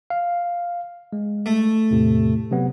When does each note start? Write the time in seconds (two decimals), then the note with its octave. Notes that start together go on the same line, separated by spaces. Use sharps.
0.10 F5
1.13 G#3
1.46 A3
1.91 E2 A2 C3
2.51 C3 F#3 B3